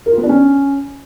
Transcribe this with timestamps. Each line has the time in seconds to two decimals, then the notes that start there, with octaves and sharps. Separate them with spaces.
0.06 A#4
0.12 F4
0.17 B3
0.23 D4
0.29 C#4